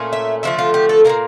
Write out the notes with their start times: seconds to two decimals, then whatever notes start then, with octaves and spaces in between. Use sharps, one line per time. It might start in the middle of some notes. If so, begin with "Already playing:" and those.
Already playing: A#2 A3 C#4
0.13 E5
0.43 D3 F3 A3 E5
0.59 F4
0.74 G4
0.89 A4
1.05 A#2 F3 A#3 A#4